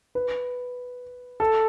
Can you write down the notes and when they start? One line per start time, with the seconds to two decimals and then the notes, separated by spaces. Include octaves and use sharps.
0.15 B4
1.40 A4